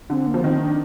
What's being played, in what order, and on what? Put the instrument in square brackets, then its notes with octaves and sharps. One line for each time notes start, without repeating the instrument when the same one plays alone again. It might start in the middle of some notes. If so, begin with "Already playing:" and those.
[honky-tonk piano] D3 [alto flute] C4
[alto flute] A#3
[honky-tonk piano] F3
[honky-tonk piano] D#3 [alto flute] C4
[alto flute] D4